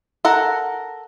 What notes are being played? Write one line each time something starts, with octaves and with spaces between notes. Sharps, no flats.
A4 A#4 F#5